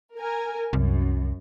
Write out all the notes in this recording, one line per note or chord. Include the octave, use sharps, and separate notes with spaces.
A#4 G#5
C2 F#2